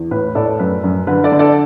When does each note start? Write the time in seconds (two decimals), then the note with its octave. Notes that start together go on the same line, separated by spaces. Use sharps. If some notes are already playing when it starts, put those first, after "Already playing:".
Already playing: E2
0.11 A2 B4
0.35 A2 A4 D5
0.59 F#2 B4
0.84 F#2
1.07 D3 B4
1.24 A4 D5
1.32 D3
1.39 A4 D5